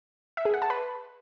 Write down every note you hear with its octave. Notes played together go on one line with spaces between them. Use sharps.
E5
G#4
F#5
A5
B4